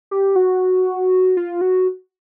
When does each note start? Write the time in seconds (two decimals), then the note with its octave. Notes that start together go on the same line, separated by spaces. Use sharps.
0.11 G4
0.36 F#4
1.37 F4
1.61 F#4